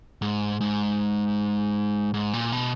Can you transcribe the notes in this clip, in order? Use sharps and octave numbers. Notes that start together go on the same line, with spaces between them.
G#2
G#2
G#2
A#2
B2